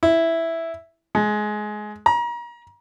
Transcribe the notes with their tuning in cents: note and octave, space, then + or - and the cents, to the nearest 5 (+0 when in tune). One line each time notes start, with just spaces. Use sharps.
E4 +0
G#3 +20
A#5 +35